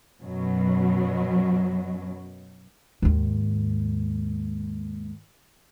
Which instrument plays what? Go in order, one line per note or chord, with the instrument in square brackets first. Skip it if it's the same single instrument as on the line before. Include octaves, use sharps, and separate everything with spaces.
[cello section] F#2 B2 F#3
[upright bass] D#2 G#2